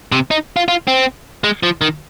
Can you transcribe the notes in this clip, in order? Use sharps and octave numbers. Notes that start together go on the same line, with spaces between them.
C3
D#4
F4
F4
C4
G#3
F3
D#3